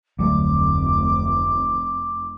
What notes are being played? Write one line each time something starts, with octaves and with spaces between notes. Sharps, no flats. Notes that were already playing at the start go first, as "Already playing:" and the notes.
F1 D2 F#3 A3 D6